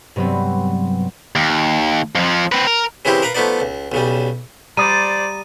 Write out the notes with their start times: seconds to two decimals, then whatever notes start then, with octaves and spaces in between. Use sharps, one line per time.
0.16 G2 C3 F#3 B3 C4
1.36 D#2
2.15 F2 F3
2.52 C4 B4
2.67 A#4
3.05 C#3 E3 G#3 C4 E4 G4
3.22 A#4 B4 F5 A#5
3.35 F3 A3 B3 D#4 D5
3.60 C#2
3.92 B1 C#3 G3
4.77 G3 C5 D5 A#5 D#6 A6 D#7